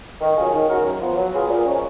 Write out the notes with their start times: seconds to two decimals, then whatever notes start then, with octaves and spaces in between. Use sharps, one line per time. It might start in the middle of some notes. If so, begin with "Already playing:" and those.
0.21 D#3
0.37 F#3 C#4 F4 G#4
0.53 D#3
0.69 G#3 C#4 F#4 A#4
0.85 F#2
1.01 F3 B3
1.17 F#3
1.33 B3 F4 G#4
1.49 A#2
1.65 F3 G#3 C#4